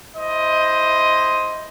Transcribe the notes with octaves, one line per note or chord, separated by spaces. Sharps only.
E4 C5 D#5